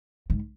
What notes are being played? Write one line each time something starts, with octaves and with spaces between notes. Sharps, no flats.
G#2